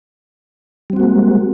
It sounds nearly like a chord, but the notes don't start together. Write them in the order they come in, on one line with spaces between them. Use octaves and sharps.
G3 C4 F#4 A#3 G#3